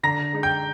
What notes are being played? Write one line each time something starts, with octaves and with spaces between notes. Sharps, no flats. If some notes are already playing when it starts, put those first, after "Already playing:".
D3 A#5 A#6
G#3 D#4
G5 G6